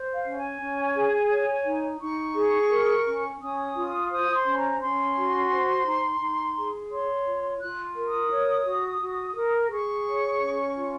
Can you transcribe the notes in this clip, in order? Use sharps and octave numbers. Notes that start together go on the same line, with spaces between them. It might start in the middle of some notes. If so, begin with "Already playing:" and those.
Already playing: C5
F5
C#4
G#5
C#4
G#4
C#5
D#4
D#4 C#6
G#4
A#4
C#4
C#4 D#6
F4
C5 D#6
C6
C#4
A#5
C#4 C6
F#4
C5
D#4
D#4
G#4
C#5 C6
F4
F4 F#6
A#4
D#6
C#5
F#4
F#4
A#4
G#4 C#6
C#5
C#4
F4